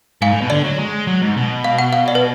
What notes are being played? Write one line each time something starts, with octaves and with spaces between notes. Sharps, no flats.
G#2 F5 G#5
A2
B2
D3 D5
F#3
G#3
F#3
G#2
B2
F5
F#5
F5
D5
B4